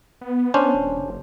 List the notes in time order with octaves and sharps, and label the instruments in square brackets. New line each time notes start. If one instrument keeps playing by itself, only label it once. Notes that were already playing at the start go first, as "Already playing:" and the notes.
[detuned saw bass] B3
[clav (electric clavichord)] C#4 D4 C5
[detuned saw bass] D#1
F#1